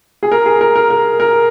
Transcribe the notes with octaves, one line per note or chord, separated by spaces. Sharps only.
G#4
A#4
G#4
A#4
A#4
A#4
A#4